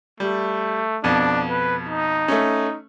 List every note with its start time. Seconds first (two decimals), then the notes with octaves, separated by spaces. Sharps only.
0.20 G3 A3
1.04 F2 B2 D4
1.50 B4
1.89 D#4
2.28 A3 C#4